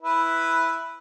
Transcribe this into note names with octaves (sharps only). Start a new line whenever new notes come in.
E4 B4